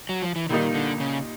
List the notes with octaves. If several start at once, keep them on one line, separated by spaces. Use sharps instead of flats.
F#3
F3
E3
A#2 D#3 G3 A#3 D#4
D3
C#3